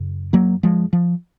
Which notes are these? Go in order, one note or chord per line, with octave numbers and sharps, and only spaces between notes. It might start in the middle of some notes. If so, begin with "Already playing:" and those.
Already playing: F#2 C#3
F#3 A#3
F3 G#3
F3